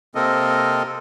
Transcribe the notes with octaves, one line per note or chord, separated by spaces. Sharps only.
C3 A#3 C4 A4 A#4 D#5